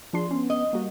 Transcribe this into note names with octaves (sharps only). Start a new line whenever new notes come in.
F3 D4 G#4 C6
B3 C#4
D#5
G3 A#3 F#4